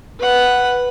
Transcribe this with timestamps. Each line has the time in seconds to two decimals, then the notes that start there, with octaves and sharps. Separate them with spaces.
0.19 B4 F#5